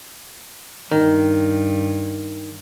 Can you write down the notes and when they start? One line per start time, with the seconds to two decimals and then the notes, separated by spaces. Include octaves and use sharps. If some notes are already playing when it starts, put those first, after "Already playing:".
0.91 G2 D#3